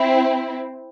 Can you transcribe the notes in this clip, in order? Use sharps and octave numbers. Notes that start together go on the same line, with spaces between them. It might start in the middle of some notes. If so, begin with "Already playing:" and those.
Already playing: C4 E4